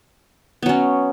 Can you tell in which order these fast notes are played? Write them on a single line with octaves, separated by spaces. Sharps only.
B3 F#3 C#4